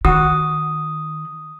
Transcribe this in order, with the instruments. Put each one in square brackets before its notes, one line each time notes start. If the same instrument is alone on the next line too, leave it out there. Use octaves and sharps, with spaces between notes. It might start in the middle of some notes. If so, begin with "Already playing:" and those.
[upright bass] D#3 [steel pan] F#4 [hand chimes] D#6